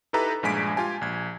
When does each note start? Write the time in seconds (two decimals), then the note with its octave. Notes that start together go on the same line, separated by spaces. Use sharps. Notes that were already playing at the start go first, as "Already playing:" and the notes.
0.13 D#4 E4 G4 A4 B4 A#5
0.43 A#1 G2 G#3 G#5 B6 D7
0.76 F4 G4 G#5 A5
1.01 A#1 G#6